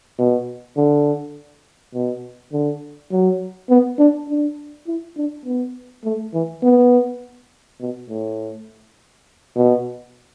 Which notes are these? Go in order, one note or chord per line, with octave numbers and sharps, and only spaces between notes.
B2
D3
B2
D3
F#3
B3
D4
D4
E4
D4
B3
A3
E3
B3
B2
A2
B2